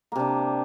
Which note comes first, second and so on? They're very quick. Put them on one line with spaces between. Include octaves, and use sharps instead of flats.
A#3 C3 D4